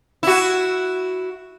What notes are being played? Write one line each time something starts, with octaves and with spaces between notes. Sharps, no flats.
E4 F#4